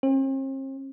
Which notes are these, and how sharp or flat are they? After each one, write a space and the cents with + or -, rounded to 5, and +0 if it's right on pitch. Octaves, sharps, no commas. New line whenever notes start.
C4 +45